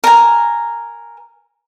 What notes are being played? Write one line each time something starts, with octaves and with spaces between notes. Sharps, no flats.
A#4 G#5